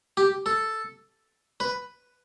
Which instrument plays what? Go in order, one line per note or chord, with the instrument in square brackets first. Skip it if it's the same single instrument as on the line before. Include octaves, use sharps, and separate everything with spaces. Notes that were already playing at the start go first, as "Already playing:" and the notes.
[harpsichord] G4
A4
B4